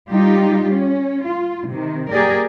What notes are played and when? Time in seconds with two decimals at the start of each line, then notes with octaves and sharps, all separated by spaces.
0.11 G3 D#4 F4 G4
0.73 C#4
1.26 F4
1.67 C3 D#3
2.10 A#3 G4 G#4 A#4 D5